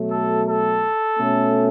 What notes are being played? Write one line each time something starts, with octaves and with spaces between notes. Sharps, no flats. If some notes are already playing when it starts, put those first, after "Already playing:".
Already playing: B2 F#3 A3
A4
A4
B2 A3 C#4